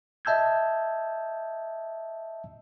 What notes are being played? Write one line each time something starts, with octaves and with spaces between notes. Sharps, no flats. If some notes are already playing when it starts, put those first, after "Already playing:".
D#5 E5 A5 E6 G6 G#6